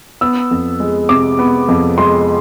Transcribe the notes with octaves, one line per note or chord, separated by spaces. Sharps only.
B3 E6
F2
G#3
C3 D6
B3
F2
G#3 C6